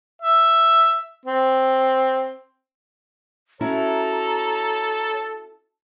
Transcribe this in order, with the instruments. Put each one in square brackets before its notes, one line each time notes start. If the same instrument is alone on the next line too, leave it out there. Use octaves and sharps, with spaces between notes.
[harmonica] E5
C4
[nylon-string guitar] C#4 E4 F#4 [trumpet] A4 [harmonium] C#5 [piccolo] A#5